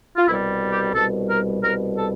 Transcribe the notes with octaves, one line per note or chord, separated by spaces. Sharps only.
F4
C2 B2 G3 E4
G4
C2 B2 G3 A4
A#4
C2 B2 G3 A#4
A4